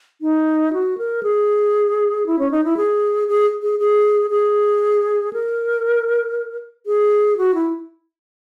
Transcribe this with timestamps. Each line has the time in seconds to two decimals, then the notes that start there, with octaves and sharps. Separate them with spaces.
0.21 D#4
0.73 F#4
0.98 A#4
1.23 G#4
2.26 E4
2.39 C#4
2.51 D#4
2.64 E4
2.77 G#4
3.28 G#4
3.62 G#4
3.79 G#4
4.30 G#4
5.33 A#4
6.86 G#4
7.38 F#4
7.55 E4